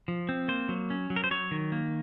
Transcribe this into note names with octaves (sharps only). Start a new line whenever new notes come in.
F3
C4
A#3 C5
F#3
C#4
F#3
A#4
C5
F#3 C#5
D#3
A#3